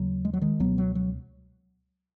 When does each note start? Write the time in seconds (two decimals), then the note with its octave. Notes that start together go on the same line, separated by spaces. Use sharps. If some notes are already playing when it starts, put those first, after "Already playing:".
Already playing: D#2 C#3 F#3
0.25 G#3
0.33 F#3
0.41 D#3 G#3
0.60 C#2 B2 F#3 B3
0.78 F#3
0.95 F#3